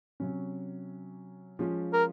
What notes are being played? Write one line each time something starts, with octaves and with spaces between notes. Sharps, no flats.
C3 F#3 C#4
F3 G#3 C#4 F4
A#4